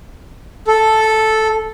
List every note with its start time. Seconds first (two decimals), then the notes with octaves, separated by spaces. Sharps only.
0.67 A4